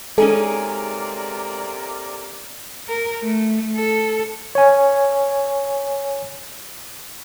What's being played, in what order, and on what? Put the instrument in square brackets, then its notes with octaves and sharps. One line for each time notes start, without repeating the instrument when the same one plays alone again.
[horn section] C3 A#3 D5 [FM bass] G#3 [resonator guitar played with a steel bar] C#4 D#4 G#4 [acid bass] A4
[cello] A#4
A3
A4
[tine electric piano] C#5 G#5